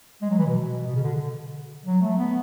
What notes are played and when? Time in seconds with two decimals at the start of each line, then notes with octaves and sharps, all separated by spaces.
0.22 G#3
0.30 F#3
0.38 E3
0.46 B2
0.87 B2
0.95 C#3
1.03 D3
1.85 F#3
2.01 A3
2.18 B3